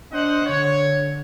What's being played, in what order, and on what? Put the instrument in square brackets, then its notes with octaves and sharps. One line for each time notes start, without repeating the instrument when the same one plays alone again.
[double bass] D4 [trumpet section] C5 D#5 F#5
[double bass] D3 [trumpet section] C#5